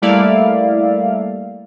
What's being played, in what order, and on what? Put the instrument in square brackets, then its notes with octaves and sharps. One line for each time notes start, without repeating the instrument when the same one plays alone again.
[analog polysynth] G3 A3 A#3 E4 D5 F5